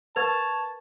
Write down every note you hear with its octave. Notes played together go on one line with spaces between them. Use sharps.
A#4 B4 F#5 A5 C#6 G#6 F7